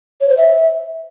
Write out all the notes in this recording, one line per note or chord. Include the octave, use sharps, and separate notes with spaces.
C#5
C5
E5